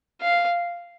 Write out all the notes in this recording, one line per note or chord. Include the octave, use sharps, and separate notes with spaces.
F5